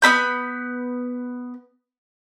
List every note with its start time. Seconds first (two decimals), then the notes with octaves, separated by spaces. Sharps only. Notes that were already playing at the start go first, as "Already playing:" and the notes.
0.02 B3 C4 B5 G6